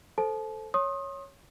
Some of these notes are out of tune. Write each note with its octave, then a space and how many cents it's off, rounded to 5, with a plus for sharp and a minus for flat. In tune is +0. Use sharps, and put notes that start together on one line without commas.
A4 +0 C5 +0 A5 -35
C#5 +0 C6 +40 D#6 +0